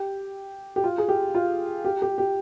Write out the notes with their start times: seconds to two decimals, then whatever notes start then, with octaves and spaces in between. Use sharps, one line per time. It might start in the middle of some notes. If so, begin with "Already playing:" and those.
Already playing: G4
0.76 G4
0.84 F4
0.98 G#4
1.09 G4
1.35 F4
1.85 G4
2.02 G4
2.18 G4